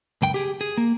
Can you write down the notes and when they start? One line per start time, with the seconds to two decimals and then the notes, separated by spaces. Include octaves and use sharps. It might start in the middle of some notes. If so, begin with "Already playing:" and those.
0.22 C#2 F#2 G5
0.34 G4 G#4
0.61 G#4
0.77 A#3